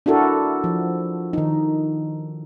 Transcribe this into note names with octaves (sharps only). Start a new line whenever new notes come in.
D4 E4 F#4 A4 A#4
F3
D#3 D#4